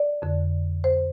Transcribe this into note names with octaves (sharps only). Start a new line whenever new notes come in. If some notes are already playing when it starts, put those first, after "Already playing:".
Already playing: D5
F2 D3
C5